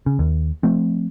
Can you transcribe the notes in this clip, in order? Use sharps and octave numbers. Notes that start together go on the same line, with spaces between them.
C#3
D#2
F3 A3 C4